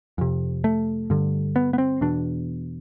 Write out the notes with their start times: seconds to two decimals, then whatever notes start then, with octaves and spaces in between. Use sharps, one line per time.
0.18 F2 C3
0.64 A3
1.10 G2 D3
1.56 B3
1.73 B3
1.78 C4
2.01 E2 B2 D4